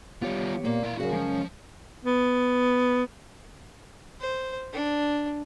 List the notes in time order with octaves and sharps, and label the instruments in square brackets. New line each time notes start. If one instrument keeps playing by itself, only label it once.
[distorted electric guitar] G3 F4 [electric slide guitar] B3 G4 C#5
[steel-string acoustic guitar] A#2 [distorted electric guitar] A#3
[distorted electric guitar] E4 F5
[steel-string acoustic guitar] F#2 C#3 [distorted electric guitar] F#4
[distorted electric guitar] F3 [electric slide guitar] G#3 A#3 C#4
[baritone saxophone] B3
[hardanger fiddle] C5
D4